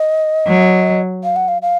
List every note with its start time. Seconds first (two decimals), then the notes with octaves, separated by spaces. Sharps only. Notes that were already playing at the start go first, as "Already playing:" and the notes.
Already playing: D#5
0.47 F#3
1.24 F5
1.36 F#5
1.48 F5
1.62 F5